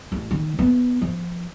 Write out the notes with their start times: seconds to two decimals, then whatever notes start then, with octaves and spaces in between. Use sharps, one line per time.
0.12 A1
0.31 D#3
0.59 B3
1.02 F3